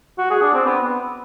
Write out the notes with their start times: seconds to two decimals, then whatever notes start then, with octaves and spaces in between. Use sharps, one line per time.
0.19 F#4
0.31 G#4
0.42 D4
0.54 C4
0.66 B3